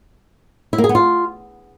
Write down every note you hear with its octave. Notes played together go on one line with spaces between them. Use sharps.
E4
A#3
G#4
B3
F4